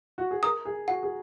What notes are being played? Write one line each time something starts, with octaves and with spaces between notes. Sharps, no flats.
F#4
G#4
A#4 D#6
G#4
F#4 F#5
G#4